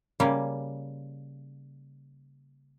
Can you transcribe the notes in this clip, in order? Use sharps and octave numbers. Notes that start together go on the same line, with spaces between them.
C#3 G3 A#3